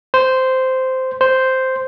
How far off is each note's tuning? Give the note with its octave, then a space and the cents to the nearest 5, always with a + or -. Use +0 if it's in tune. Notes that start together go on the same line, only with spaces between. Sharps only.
C5 -10
C5 -5